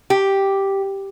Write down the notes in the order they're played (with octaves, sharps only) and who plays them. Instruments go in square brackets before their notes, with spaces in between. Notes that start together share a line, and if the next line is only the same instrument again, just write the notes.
[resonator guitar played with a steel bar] G4